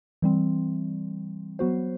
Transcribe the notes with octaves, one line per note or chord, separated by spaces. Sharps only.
E3 G3 C4
F#3 B3 F#4 C5